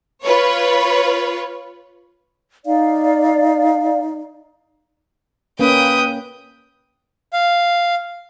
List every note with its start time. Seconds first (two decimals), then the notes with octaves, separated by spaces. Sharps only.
0.22 F4 B4 C#5
2.66 D#4 D5 F5
5.59 A#3 C#4 B4 G5 D#6
7.33 F5